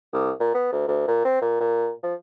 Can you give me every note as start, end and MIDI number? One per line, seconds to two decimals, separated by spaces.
0.13 0.31 36
0.40 0.51 46
0.54 0.71 59
0.72 0.85 38
0.88 1.06 38
1.08 1.23 46
1.25 1.40 60
1.41 1.56 46
1.60 1.92 46
2.03 2.14 53